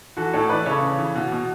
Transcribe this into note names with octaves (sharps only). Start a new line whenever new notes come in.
E3 F#4 A4
A2 A4 C#5
E3 B4 D5
C#3 A4 C#5
C#3
E3
B2
B2